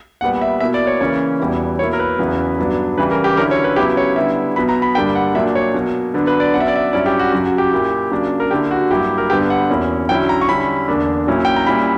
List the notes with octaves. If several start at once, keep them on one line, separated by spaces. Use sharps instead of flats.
A#2 G3 B3 F#5
E5
B2 A#3 E4 E5
D5
C#5
C#3 E3 A#3 C#4 E4 C#5
E2 B2 G3 B3 E4
B2 A#3 E4 C#5
A#4
B4
E2 C#3 F#3 B3 E4
G2 F#3 B3 D4
C#3 E3 G3 B4
A#4
G4
D3 F#3 C#4 E4 A#4
C#5
B4
C#3 F#3 B3 E4 G4
C#5
D3 G3 B3 E4 E5
B2 F#3 B3 B5
A#5
B5
G2 D3 G3 A#3 D4 G5
F#5
A#2 F#3 A#3 D4 E5
C#5
B2 F#3 A#3
D3 F#3 B3 D4
B4
D5
B2 F#3 C#4 F#5
E5
D5
E5
G2 F#3 C#4 E4 D5
G4
F#4
F#2 C#3 F#3 F#4
F#4
G4
A#2 A#3 E4
C#3 F#3 A#3 D4
A#4
D3 A#3 E4 G4
F#4
G2 F#3 A#3 E4 G4
A#4
G2 D3 G3 B3 G4
F#5
E2 B2 A#3 C#4 E4
D3 F#3 C#4 E4 G5
A#5
C#6
D3 G3 C#4 E4 B5
E2 D3 A#3 D4
A#2 F#3 C#4 E4
G5
A#5
A#2 G3 C#4 E4 B5